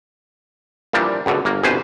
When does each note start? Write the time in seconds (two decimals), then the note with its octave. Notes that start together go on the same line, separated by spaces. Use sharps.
0.93 A#2 E3 F3 G3 D4
1.26 C#2 F#2 B2 D3
1.45 G1 A#3
1.63 G1 C2 B2 B4 C5 G#5